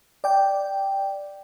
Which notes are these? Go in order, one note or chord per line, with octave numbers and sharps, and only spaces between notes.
D5 G5